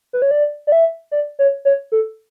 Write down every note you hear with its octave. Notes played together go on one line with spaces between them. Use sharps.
B4
C#5
D5
D5
E5
D5
C#5
C#5
A4